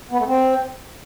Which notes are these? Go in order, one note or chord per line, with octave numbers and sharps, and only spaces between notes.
B3
A3
C4